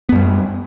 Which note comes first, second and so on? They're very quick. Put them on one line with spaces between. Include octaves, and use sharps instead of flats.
B3 F#2 G3